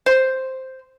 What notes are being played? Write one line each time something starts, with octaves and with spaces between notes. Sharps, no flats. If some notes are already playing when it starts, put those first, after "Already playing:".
C5